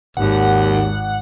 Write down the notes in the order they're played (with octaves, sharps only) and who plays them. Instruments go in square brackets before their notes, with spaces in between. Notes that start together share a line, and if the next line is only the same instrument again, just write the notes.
[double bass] G#1 [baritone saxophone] D#2 [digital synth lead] F#5